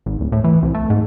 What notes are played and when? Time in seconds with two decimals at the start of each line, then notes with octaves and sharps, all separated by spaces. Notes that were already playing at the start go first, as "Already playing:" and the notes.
0.06 G#1
0.20 D1
0.32 A2
0.44 E3
0.63 C2
0.74 A3
0.90 G#2